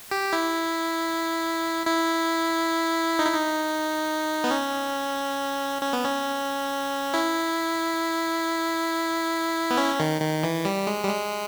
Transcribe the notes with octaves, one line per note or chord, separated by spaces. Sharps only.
G4
E4
E4
D#4
E4
D#4
B3
C#4
C#4
B3
C#4
E4
B3
C#4
D#3
D#3
E3
G3
G#3
G3
G#3